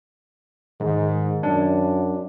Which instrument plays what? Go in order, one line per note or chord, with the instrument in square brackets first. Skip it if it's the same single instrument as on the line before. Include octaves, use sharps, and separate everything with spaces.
[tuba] G#2 [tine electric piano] D#3
[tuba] F#2 [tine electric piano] D4